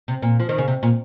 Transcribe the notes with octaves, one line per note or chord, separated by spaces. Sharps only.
C3
A#2
F3
D#3
C#3
C3
A#2